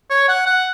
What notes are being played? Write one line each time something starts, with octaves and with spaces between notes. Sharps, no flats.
C#5
F#5
F#5